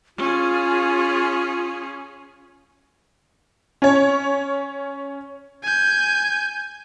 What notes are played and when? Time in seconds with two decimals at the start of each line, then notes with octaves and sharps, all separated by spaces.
0.18 C#4 F4 G#4
3.82 C#4 C#5
5.63 G#5 G6